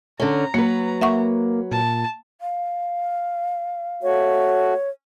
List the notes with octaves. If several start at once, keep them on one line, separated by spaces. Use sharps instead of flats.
D3 C#4 A#5
F#3 A#3 B4
A#3 E5 F#5 C#6
A#2 A5
F5
A3 F#4 C#5